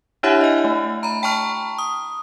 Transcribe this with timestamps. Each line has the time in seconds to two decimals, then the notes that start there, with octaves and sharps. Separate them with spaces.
0.23 D4 E4 G4 C#5 E5 F#5
0.41 D#5 G#5
0.64 A3
1.03 A#5 B5
1.23 G5 A5 A#5 C#6 F6
1.78 D#6